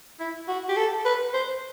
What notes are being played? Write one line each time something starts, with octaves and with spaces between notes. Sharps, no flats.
E4
F#4
G4
A4
B4
C5